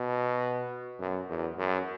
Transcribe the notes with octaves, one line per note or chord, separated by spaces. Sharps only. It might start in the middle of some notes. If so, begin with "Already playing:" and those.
Already playing: B2
F#2
E2
F#2